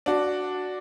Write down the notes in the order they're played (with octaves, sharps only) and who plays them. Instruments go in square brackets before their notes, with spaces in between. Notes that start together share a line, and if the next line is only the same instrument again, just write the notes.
[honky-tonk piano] D4 F#4